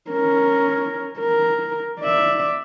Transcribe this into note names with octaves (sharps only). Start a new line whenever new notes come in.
C#4 A#4
A#4
D5 E5